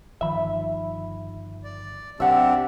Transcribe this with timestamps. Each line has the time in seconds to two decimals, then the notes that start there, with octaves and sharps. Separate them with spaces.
0.21 G1 D#3 F3 E5 B5
1.64 D5
2.20 B1 C4 D4 G4 E5 F#5